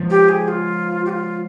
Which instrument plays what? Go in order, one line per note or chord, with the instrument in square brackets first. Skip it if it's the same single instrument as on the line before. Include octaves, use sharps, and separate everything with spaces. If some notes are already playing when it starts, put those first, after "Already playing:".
Already playing: [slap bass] F3 G#3
[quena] G4
G#4
F4
G4
F4